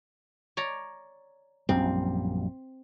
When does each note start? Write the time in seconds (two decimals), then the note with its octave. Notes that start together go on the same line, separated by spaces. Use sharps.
0.57 C#5 D5 A#5
1.69 A#1 F#2 G3 C4